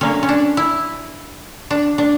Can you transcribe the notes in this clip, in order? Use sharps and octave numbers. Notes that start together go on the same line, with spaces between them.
D3 F#3 A#3 C#4
C#4
D4
E4
D4
D4